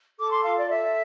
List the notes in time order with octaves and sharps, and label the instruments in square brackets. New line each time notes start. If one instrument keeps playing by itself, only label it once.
[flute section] A4 D6
C6
F4 F5
D5
A4 E5